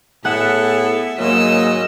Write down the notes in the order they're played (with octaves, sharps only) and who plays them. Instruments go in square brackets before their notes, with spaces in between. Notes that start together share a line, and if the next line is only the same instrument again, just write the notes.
[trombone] A2 [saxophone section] B3 G#4 A4 [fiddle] E5 [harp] F#5
[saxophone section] G#2 C#3 F#3 [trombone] A#3 [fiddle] D#5 E6